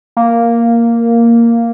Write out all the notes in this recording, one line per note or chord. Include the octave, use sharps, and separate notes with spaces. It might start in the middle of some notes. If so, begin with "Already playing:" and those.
A#3